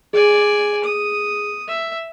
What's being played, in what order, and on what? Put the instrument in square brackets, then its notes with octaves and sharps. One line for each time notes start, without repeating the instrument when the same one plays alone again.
[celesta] G#4 [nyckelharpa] D5 G#5
[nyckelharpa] D#6
E5